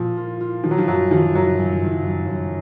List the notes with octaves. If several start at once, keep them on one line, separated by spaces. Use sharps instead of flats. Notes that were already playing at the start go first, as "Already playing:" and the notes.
Already playing: A#2 F3
F4
F4
D#3 F3
F#3
F3
F#2 F#3
D#3 F3
F#1 F#3
F#2
F#1
F#2
F#2